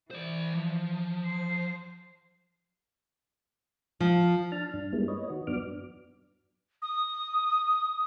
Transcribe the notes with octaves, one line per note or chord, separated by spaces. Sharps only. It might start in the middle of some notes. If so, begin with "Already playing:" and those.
E3 C5 D5
F3
C5
F3
D4 A5 F6
G2 D4
G3 G#3 A#3 B3 E4
B4 C#5 D#5
D#3 F#4
G2 F#3 B3 D4 D6 F6
D#6